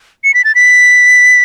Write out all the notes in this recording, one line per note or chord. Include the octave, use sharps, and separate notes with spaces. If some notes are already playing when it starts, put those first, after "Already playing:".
C#7
B6
A6
B6